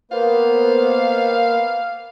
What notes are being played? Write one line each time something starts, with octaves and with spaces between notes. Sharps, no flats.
A#3 B3 C5 F5